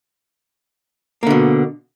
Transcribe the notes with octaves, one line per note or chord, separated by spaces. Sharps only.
B2 D3 A#3